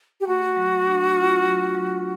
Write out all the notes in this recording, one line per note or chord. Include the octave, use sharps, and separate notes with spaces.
G4
A3 F#4
F#3
D4
F4
F#3
F#3